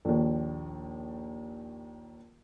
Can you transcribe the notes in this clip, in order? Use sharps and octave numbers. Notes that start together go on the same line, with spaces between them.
A#1 D#2